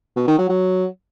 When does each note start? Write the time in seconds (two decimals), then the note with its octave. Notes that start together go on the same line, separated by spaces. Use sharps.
0.17 B2
0.28 D#3
0.39 F#3
0.50 F#3